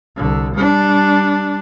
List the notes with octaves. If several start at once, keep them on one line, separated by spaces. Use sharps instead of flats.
C2 D3
G3 D4